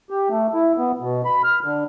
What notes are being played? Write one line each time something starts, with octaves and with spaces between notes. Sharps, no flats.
G4
A3
E4
B3
B2
B5
F6
D3